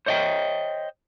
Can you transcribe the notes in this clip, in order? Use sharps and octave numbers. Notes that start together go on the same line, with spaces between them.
C5 C#5 D#5 E5 G5